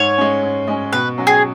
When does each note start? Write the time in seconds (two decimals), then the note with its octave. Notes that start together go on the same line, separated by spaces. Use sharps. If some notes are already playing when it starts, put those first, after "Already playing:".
Already playing: G#2 C#5
0.18 G#3 C#4
0.43 G#2
0.68 G#3 C#4
0.93 B2 B4
1.18 F#3 C#4 F#4
1.27 G#4